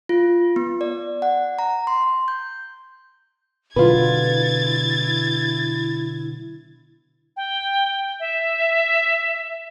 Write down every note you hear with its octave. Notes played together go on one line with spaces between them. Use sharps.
F4
B3
D5
F#5
A#5
C6
G6
B2 D3 F#3 E4 F4 B4 G#6 A6
G5
E5